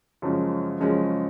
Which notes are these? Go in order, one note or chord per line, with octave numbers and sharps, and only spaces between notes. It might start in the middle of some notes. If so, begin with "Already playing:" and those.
F#2 C#3 F3 G#3 C#4
F#2 C#3 F3 G#3 C#4